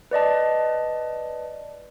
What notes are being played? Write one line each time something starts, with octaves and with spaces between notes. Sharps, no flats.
B4 D5 D#5 A5